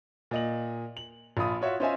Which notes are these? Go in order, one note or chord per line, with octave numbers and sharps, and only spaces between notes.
A#2 D#5 F#7
F#7
A#1 F4 B5 D#6
F4 F#4 C#5 E5
C#4 F4 C5 D#5 E5 G#5